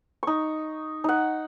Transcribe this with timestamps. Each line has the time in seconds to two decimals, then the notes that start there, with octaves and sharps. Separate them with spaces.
0.23 D#4 C#6
1.04 D#4 F#5